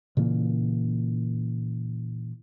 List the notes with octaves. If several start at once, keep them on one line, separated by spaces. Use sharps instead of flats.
A#2 C#3 E3 A#3